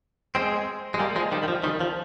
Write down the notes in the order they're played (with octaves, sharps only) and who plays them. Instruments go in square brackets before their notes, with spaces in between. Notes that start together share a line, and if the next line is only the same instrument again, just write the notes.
[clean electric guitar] G#3 C4
G#3
G3 A#3
F3 G#3
D#3 G3
D#3
F3
D#3 G3
F3